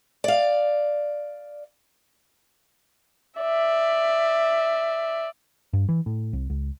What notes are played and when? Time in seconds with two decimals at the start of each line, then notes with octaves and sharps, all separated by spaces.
0.24 D5 F5
3.40 D5 E5
5.73 G2
5.89 E3
6.06 A2
6.33 C2
6.50 C#2